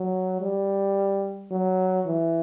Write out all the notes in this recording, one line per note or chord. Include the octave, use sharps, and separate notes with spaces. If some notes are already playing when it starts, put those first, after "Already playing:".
Already playing: F#3
G3
F#3
E3